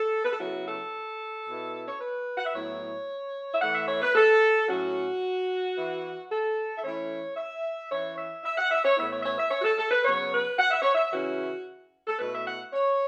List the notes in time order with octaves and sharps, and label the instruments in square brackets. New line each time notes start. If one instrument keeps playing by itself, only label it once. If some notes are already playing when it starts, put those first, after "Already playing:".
Already playing: [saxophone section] A4
B4
A4
C#3 F#3 B3 E4 F#4
A4
B2 B3 E4
C#5
B4
F#5
E5
A2 F#3 B3 E4 C#5
E5
E3 A3 E4 F#5
E5
C#5
B4
A4
A2 F#3 C#4 F#4
E3 B3 E4
A4
E5
E3 A3 C#4 E4 C#5
E5
E3 C#4 E4 C#5
E5
E5
F#5
E5
C#5
A2 E3 B3 E4 E5
C#5
E5
C#5
E5
C#5
F#4
A4
A4
B4
C#3 F#3 B3 C#5
B4
F#5
E5
C#5
E5
C#3 E3 C#4 E4 F#4
A4
B2 A3 E4 B4
E5
F#5
C#5